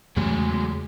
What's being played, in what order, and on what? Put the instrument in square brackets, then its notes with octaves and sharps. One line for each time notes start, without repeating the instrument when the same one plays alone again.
[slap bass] E2 C#3 A3 [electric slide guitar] F#3 G#3